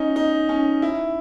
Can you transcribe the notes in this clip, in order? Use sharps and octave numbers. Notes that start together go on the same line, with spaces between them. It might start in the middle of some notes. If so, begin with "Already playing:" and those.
Already playing: C#4 D#4
D#4
C#4
E4